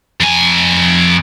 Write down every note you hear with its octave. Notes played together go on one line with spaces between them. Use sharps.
F2 G#5